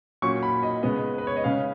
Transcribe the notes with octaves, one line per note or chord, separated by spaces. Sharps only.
A#2 F#3 C#4 C#6
B5
D#5
C#3 G#3 B3 D#5
B4
C#5
D#5
C#3 G#3 C#4 F5